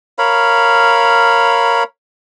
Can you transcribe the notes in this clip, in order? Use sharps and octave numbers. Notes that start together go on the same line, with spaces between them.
A#4 C#5 F5 B5